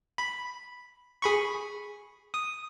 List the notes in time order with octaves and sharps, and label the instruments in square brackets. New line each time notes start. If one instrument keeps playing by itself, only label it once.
[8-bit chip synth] B5
G#4 B5 C#6
D#6